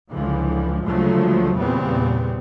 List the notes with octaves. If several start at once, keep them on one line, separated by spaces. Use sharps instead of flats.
C#2 D3 E3 F3
D2 C#3 F3 F#3 G#3 A3
E2 A#2 C#3 G3 B3 C4